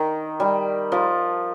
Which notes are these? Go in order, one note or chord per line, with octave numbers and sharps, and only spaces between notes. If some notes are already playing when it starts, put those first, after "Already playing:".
Already playing: D#3
G3
F3